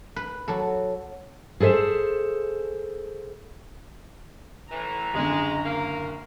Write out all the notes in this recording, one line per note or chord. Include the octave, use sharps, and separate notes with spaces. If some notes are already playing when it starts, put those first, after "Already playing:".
B4
F#3 A4
G#4 A4 C5 E5
A2 E3 A#5
F#1 D3 G#3
A#3